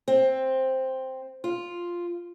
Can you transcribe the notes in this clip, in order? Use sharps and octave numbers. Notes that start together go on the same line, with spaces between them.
C4
F4